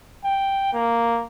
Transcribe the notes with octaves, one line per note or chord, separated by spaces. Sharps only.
G5
A#3